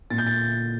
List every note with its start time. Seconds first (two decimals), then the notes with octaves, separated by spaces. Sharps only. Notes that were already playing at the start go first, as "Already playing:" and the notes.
0.10 A#2 A6
0.18 G6
0.27 A6